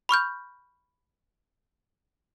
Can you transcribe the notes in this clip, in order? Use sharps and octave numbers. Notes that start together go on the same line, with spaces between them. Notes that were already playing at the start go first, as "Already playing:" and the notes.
B5 C#6 F6 G6